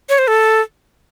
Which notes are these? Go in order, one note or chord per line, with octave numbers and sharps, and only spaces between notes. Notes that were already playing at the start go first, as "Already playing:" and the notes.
C#5
C5
A4